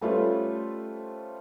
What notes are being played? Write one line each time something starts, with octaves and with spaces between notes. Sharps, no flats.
G3 A3 C#4 F4 B4 C5